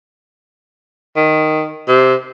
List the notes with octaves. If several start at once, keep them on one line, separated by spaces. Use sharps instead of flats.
D#3
C3